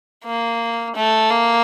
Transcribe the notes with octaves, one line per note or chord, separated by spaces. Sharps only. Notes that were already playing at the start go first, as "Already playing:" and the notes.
A#3
A3
A#3